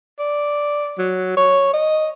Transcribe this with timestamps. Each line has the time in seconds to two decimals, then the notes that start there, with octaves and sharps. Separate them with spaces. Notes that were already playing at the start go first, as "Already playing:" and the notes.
0.19 D5
0.98 F#3
1.37 C#5
1.74 D#5